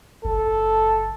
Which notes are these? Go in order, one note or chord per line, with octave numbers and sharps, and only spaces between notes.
F#1 A4